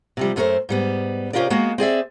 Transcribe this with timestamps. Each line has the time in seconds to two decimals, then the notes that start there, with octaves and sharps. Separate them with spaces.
0.17 C3 F3 G3
0.36 F#2 A3 D4 A4 A#4 C5
0.69 G#2 G3 B3
1.33 C3 C#4 F4 G4 A#4 D5
1.50 G#3 A#3 B3 F#4
1.78 C4 G#4 D5 E5